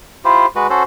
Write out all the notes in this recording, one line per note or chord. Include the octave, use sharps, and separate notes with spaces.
E4 F4 G4 C5
G#3 F#4 B4
C#4 F#4 A4 C5